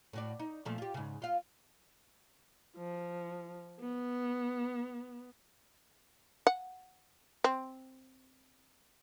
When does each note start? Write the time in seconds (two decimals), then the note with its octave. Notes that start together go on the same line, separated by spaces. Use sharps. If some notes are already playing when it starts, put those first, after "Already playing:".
0.13 A2 F#4 D5
0.40 D#4
0.65 A#2 F3 A3
0.78 F4 G4
0.94 G#2 C#3
1.22 F4 F5
2.77 F3
3.80 B3
6.47 F#5
7.44 C4